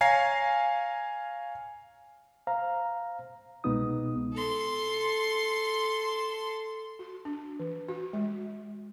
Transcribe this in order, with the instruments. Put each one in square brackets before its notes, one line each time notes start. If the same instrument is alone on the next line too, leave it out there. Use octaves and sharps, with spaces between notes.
[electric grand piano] C#5 F5 G#5 A#5 C7
[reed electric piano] C5 F5 A#5
C2 B2 G#3 B3 D#4 D#6
[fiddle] A4 C6
[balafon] F#4
D4
E3
F#4
G#3